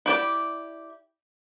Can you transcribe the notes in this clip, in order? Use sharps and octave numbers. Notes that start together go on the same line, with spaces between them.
E4 G4 D5